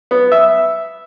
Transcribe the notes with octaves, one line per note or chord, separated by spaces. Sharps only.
B3
E5